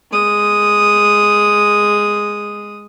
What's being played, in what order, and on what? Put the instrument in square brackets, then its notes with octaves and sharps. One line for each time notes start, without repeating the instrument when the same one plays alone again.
[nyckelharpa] G#3 D#6